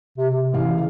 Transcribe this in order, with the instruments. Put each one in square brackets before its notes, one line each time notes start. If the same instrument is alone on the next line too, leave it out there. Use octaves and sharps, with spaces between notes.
[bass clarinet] C3
C3
[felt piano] A1 E3 F5
[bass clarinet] C#3